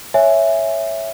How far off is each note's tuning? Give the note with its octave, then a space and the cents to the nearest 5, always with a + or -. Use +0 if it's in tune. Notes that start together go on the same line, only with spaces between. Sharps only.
C#5 +0 E5 +0 G#5 +0